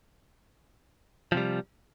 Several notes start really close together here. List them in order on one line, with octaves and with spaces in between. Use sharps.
F3 C3 G3